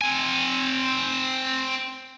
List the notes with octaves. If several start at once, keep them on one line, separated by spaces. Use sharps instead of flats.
C4 G#5